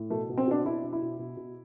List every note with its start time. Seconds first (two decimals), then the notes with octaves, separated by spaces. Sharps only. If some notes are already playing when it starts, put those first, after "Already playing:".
Already playing: A2
0.10 B2 A3
0.29 B2
0.37 C4
0.47 B2 D4
0.65 B2 E4
0.84 B2
0.93 E4
1.02 B2
1.19 B2
1.37 B2